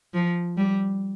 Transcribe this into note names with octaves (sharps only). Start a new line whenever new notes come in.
F3
G3